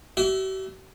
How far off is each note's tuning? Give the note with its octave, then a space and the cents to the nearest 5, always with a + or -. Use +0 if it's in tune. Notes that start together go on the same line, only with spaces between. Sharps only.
G4 -45 E5 +0